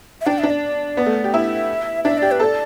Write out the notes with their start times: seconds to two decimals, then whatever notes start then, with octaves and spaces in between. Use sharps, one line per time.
0.21 E5
0.26 D4 G5
0.39 D4 E5
0.50 D5
0.97 B3
1.06 A3
1.24 G4
1.33 E4 E5
2.04 D4 E5
2.18 G4 D5
2.31 B4
2.40 A4
2.45 D5